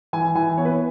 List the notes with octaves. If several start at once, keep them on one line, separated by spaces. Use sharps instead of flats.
E3 G#5
E3 G#5
B3 C#5
B4